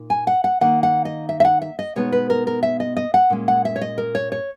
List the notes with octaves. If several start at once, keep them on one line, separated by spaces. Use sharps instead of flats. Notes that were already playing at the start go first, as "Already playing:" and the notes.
Already playing: A#2 D#4
G#5
F#5
F#5
D#3 A#3 D#4 F#5
F#5
D#5
E5
E5
F#5
E5
D#5
B2 G#3 B3 D#4 C#5
B4
A#4
A#4
E5
D#5
D#5
F#5
A#2 G#3 C#4
F#5
E5
C#5
D#5
A#4
C#5
C#5